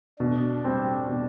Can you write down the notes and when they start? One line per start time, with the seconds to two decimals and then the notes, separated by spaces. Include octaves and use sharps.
0.19 B2 D4
0.64 G3 C4
1.08 B2